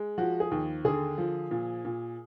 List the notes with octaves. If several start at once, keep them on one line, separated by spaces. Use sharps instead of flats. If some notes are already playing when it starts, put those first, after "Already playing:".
Already playing: G#3
F3 F#4
G#4
D#2
D3 G#4
F3
A#2
A#2